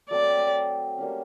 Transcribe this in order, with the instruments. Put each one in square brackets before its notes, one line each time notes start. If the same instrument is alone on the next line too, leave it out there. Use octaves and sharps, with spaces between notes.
[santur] F#3 A3 C4 [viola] D5
[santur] G3 A#3 C#4